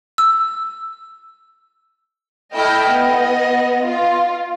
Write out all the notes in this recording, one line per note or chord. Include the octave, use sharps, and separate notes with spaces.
E6
A3 E4 D#5 G5 F6 G6
B3 D#5
F4